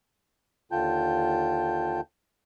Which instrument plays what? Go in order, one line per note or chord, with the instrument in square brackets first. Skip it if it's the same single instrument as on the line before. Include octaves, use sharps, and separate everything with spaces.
[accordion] D#2 D3 F4 G5 A5 G6